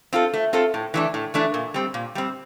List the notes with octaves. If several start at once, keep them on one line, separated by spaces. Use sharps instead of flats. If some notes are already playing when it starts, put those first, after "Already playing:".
C4 F4 A4
A3
C4 F4 A4
A2
E3 A3 D4
A2
E3 A3 D4
A#2
G3 C4
A#2
G3 C4